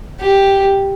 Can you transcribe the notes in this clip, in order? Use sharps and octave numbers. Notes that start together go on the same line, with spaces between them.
G4